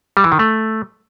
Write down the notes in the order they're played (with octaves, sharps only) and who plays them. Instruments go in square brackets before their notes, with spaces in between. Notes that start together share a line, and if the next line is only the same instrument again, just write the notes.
[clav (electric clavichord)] G3
E3
D#3
A3